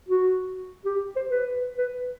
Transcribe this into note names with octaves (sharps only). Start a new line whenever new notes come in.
F#4
G4
C5
B4
B4